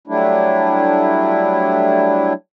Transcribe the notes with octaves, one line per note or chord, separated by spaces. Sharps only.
F#3 G3 A3 D4 E4